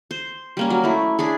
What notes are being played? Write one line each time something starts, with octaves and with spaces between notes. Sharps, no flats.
C5
G3 A#3 C#4
F#3
A3 E4
D4 E4 G#4